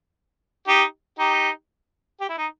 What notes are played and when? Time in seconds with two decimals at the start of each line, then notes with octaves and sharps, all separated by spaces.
0.68 D#4 G4
1.19 D#4 G4
2.21 G4
2.29 E4
2.38 D#4